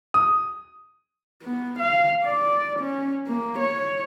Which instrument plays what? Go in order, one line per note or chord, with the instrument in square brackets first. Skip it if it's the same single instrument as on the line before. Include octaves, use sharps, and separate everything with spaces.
[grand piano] D#6
[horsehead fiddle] B3
F5
D5
C#4
A#3
C#5